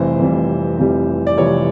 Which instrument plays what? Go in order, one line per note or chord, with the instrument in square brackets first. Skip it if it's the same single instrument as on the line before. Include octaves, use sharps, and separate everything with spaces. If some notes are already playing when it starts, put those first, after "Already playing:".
Already playing: [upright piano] F1 F2 C3 E3 G3 C5
F1 F2 C3 E3 G3
F1 F2 C3 E3 G3
D5
F1 F2 C3 E3 G3 C#5